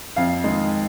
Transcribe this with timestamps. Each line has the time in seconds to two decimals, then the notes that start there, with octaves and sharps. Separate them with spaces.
0.16 F2 F5
0.44 D#3 G#3